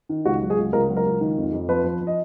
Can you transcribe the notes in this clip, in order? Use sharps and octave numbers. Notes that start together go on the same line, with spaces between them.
D#3
C#2 F#4
F#3
G#4
C#2
C#2 A#4
F#3
A#4
C#2
D#3
F2
F2
F3 B4
F3
F3
D#5